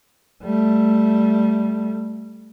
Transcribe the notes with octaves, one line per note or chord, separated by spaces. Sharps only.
G3 A3